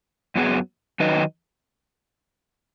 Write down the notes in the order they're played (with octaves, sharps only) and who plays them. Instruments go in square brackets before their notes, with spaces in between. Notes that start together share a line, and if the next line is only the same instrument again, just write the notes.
[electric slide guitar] F#2 F#3 B3 G#4
D#3 F#3 D#4 B4 D#5